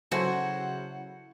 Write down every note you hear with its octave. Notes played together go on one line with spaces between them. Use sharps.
C#3 F#3 E4 F#4 A4 C5 F#5 G#5